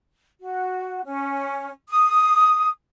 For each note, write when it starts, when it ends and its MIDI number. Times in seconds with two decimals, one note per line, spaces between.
0.40 1.01 66
1.04 1.70 61
1.88 2.69 87